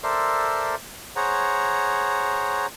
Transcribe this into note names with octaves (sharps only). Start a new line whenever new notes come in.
A4 A#4 C5 D5 E5 C6
G#4 C5 C#5 F#5 A#5